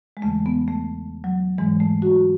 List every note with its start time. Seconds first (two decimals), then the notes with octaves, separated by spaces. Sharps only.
0.17 G#3
0.22 E2 C#3 E3 A3
0.46 B3
0.68 A3
1.24 F#3
1.58 G#2 E3 G#3
1.80 A3
2.02 F#4